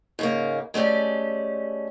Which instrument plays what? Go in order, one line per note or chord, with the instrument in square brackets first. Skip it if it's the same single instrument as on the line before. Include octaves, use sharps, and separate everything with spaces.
[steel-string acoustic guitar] G#2 C#3 A#3
G#3 A3 C#4 G4 D5